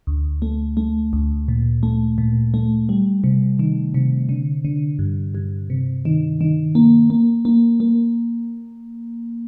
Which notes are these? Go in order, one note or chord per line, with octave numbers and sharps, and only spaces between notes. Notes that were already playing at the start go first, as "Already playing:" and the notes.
D2
A3
A3
D2
A#2
A3
A#2
A3
G3
C3
D#3
C3
D3
D3
G2
G2
C3
D#3
D#3
A#3
A#3
A#3
A#3